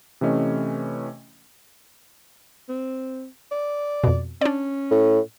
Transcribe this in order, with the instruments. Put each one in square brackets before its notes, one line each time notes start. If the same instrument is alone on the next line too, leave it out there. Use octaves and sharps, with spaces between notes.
[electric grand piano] C3 E3 A3 C#4 D#5
[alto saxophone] C4
D5
[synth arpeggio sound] F2 B2
[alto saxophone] C#4 [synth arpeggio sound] D4 D5
[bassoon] A2